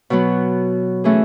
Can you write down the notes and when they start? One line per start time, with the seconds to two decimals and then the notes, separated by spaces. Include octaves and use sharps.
0.10 B2 F#3 B3
1.04 E3 A3 C#4 G#4